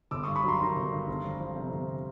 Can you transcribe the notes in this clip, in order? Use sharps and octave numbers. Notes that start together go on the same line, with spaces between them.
G1 D6 E6
C#6 D#6
G2
B5 C#6
F#3 A#5 C6
D#3 A#5 C6
G1
G2
G1
F2
F3
C3
G1